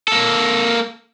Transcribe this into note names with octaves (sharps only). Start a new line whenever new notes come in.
A#3 A4